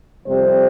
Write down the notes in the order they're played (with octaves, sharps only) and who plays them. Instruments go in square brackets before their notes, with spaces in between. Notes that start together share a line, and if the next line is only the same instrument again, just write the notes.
[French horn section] F2 C3 G3 C4 C5